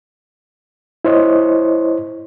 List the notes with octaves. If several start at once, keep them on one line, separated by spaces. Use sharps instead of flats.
E4 C5 C#5 D#5